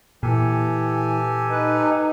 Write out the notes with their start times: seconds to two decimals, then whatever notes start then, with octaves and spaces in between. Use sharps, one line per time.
0.23 A#2 E3 G4 A4 G#5
1.51 D#4 B4